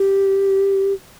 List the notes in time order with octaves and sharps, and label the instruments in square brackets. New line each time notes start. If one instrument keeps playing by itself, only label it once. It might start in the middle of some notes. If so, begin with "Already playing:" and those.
Already playing: [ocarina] G4